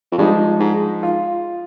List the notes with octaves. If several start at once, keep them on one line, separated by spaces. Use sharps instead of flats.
F2
G2 F3 G#3 D#4
G#2
F4